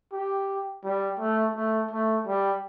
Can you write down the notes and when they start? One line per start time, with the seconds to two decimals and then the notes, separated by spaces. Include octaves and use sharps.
0.13 G4
0.84 G3
1.20 A3
1.55 A3
1.91 A3
2.27 G3